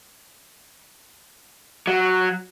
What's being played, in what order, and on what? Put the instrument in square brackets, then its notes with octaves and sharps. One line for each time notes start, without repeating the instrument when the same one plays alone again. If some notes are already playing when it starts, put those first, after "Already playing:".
[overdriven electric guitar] F#3